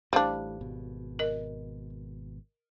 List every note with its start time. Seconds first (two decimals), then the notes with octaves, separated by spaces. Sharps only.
0.13 A1 A2 G3 D4 C5 F5 D6
0.61 G#1 B2
1.19 A#4 D#5